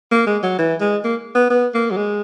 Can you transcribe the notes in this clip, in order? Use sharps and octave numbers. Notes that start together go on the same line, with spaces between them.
A#3
G#3
F#3
E3
G#3
A#3
B3
B3
A#3
F#3
G#3